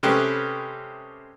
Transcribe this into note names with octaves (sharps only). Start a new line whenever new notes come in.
C3 G#3 A3 C#4 G4 B4